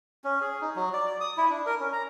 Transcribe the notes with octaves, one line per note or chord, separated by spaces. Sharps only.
C#4
G#4
D#4
F#3
D5
D5
D#6
E4
D4
A#4
C#4
A#5